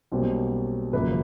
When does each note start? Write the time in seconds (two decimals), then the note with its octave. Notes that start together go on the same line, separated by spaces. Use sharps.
0.11 B1 B2 G3 A#3 C#4 C5
0.93 G#1 F#2 C#3 F3 A#3 B4